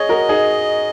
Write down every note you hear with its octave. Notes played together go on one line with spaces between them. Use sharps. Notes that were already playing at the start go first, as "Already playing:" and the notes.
Already playing: G#4 C#5 D#5
F#4 A#4
D#4 G#4